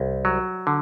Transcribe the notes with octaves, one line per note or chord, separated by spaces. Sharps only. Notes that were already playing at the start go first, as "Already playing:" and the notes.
Already playing: C2
F#3
D3